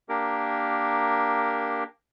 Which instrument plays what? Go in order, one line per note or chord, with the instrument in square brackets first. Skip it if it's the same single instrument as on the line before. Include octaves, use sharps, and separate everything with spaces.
[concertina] A#3 D4 G4 A#4